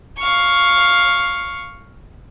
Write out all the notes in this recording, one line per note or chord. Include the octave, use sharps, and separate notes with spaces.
F5 C#6